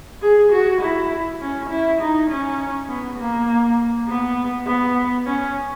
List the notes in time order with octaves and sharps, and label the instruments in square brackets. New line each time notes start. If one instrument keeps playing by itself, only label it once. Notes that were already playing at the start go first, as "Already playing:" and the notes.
[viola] G#4
F#4
E4
C#4
E4
D#4
C#4
B3
A#3
B3
B3
C#4